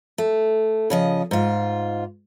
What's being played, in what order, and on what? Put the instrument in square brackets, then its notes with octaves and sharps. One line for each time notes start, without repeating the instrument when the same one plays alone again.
[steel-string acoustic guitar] A3
C#3 F3 D#5
G#2 F4